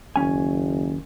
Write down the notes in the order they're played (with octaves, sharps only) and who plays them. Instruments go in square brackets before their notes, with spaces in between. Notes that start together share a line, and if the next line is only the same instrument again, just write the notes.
[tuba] F#1 [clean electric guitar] D#2 C#4 G#5